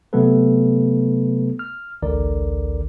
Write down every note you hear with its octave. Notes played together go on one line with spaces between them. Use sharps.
C3 F#3 A3 B3 A4 B4
F6
A1 D2 D3 A#4 D5